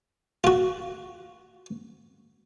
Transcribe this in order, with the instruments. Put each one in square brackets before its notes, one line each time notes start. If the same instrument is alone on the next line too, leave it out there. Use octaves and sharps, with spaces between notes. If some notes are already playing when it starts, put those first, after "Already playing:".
[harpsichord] F4 F#4